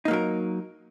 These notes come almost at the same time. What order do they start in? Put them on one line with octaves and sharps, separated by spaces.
D#4 A#3 F#3 A#4